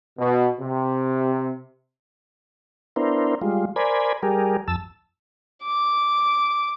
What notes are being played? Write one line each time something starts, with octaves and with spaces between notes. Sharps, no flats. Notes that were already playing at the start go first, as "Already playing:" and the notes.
B2
C3
B3 D4 E4 A#4 C5
G3 G#3 F4
A#4 C5 D5 G#5 B5
G3 G4 G#4 A#4
F2 A5 E6
D6